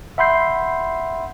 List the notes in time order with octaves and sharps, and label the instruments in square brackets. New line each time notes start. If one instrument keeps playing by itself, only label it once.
[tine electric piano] E5 F#5 B5 C6 G6 C7